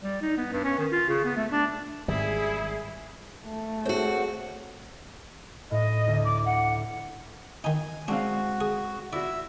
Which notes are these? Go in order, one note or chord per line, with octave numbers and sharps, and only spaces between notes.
G3
D#4
B3
G2
C#4
D#3
F4
C#3
B3
A3
D4
G#1 D#3 G3 E4 G#4
A3
C4 F#4 G#4 A4 C#5
A2 D#5
D2
D6
F#5
D#3 D#4 G#5
G#3 C4 D4 F#4 F5
G#4
E4 F#4 D5 E5